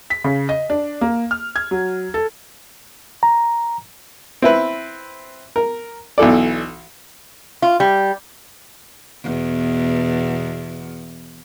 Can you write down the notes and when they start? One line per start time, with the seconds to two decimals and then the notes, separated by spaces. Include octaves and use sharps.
0.10 B6
0.24 C#3
0.49 D#5
0.70 D4
1.01 A#3
1.31 F6
1.56 G#6
1.71 F#3
2.14 A4
3.23 A#5
4.42 C4 E4 B4
5.56 A#4
6.18 B1 E3 A4 D5
7.62 F4
7.80 G3
9.23 E2 B2